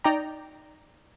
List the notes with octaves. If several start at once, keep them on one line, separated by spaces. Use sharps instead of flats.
D#4 D5 G5 A#5